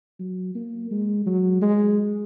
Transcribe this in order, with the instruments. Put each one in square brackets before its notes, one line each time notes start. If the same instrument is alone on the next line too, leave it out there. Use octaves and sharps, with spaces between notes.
[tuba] F#3
A#3
G#3
F#3
G#3